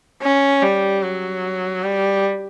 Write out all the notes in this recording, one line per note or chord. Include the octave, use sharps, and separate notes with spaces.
C#4
G3
F#3
G3